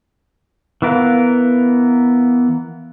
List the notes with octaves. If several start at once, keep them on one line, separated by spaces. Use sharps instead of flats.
E3 B3 A#4 F5 F#6